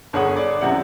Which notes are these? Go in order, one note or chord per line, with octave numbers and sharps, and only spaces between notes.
G1 G#4 C#5 F#5 D#6
D5
F#2 C3 E4 F#5